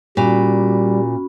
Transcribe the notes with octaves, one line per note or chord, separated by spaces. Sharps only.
A#2 G3 C#4 F#4 B5